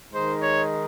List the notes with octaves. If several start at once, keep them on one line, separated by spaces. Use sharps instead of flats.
D#3 G#3 D#4 C5
C#5